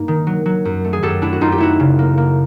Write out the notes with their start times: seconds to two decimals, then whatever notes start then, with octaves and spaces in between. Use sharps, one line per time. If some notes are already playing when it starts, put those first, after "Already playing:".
Already playing: G2 A#3 D#4
0.08 D#3
0.27 F#3
0.46 F#3
0.65 F#2
0.84 A3
0.93 G#4
1.02 F#2 G4 A4
1.22 A3 D4 E4
1.33 F#4
1.41 F#2 D#4 F4
1.52 G4
1.58 A3 E4 F#4
1.80 C#3
1.99 A#3
2.18 A#3